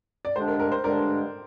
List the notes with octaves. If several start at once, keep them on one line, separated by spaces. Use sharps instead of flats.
D5
G2 D3 G#3 D4 C5
A#4
A#4
C5
G2 D3 G#3 D4 A#4 D5